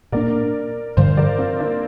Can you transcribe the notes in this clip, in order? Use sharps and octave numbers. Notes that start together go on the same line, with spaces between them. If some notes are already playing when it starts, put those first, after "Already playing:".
A#2 A#3 D4 A#4 D5
G2 D3 F3 C5 F5
A#4 D5
C4 F4
A#3 D4